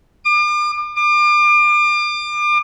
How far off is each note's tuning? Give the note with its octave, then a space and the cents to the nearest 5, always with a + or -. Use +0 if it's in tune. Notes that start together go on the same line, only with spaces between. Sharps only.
D6 +40
D6 +35